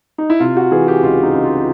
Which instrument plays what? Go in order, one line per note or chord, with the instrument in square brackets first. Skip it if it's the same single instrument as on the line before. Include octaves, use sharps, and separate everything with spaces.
[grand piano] D#4
E4
C3 F4
F#4
E3 G#4
G4
C#2 F4
D#4
C#2
F4